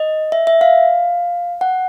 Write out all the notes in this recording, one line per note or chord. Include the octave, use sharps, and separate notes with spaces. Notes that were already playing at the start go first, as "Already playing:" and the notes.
Already playing: D#5
E5
E5
F5
F#5